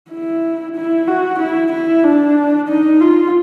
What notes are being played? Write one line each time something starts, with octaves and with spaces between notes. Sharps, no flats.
E4
E4
F#4
E4
E4
D4
D#4
F4